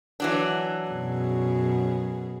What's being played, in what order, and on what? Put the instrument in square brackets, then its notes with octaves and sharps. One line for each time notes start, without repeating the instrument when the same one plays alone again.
[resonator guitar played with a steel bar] E3 F#3 D4
[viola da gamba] F#2 B2 G#4